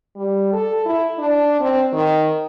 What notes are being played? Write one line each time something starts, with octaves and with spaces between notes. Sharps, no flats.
G3
A4
E4
D4
C4
D#3